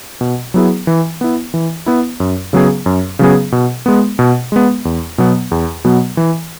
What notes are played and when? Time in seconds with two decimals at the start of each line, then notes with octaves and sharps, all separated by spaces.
0.21 B2
0.54 F#3 B3 E4 G#4
0.87 E3
1.21 B3 E4
1.54 E3
1.86 B3 E4
2.20 F#2
2.53 C#3 F#3 B3 G#4
2.86 F#2
3.19 C#3 F#3 B3 G#4
3.52 B2
3.86 G#3 B3
4.19 B2
4.52 G#3 B3
4.85 E2
5.18 B2 F#3 B3
5.51 E2
5.84 B2 F#3 B3
6.17 E3